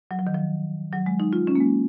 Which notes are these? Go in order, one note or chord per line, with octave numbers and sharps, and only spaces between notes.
F#3
F3
D#3
F3
F#3
G#3
D#4
F4
C#4
A#3
G#3